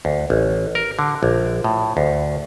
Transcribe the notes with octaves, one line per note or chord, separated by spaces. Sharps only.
D2
A1
A#4
D3
A#1
A2
D2